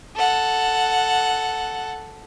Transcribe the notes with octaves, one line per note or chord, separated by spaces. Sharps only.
A4 F#5